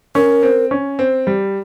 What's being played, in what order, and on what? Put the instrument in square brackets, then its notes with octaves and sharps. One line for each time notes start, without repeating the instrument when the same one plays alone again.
[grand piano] C#4 [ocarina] A#4
[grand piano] C4
C#4
C4
G3